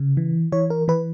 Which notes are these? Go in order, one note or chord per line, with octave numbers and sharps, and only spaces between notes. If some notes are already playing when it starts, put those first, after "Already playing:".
Already playing: C#3
E3
E3 C#5
A#4
E3 B4